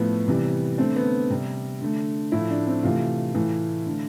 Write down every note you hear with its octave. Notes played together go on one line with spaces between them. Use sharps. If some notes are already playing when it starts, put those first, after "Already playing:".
Already playing: A2 F3 A3 B3
C3 E3 G3
D3 A3 C4
B3
C3 G3
D3 A3
A2 F3 A3 E4
D4
C4
C3 E3 A3 F4
A2 E3 A3
D3 A3